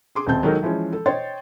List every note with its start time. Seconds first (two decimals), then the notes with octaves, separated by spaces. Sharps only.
0.15 G#4 C6 D6
0.27 D#1 C#2 C3 C4 A5 G6
0.43 D#3 F#3 G#3 D#4 A4 A#4
0.63 E3 F3 G#3 C#4
0.93 A4
1.06 C5 C#5 D#5 G5 C6 A6